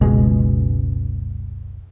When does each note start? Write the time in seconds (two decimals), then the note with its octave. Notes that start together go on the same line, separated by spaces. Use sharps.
0.01 F#1 C#2 B2 G#3